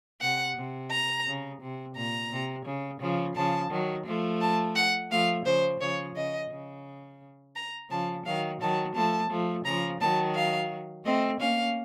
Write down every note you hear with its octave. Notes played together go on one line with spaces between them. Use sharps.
C3 F#5
C3
A#5
C#3
C3
A#2 A#5
C3
C#3
C#3 F3
C#3 F3 A5
D#3 F#3
F3 A3
A5
F#5
F3 A3 F5
C#3 F3 C5
C#3 F3 C#5
C#3 D#5
C#3
A#5
C#3 F3 A5
D#3 F#3 F5
D#3 F#3 A5
F3 A3 A5
F3 A3
C#3 F3 A#5
D#3 F#3 A5
F5
A3 C4 D#5
A#3 C#4 F5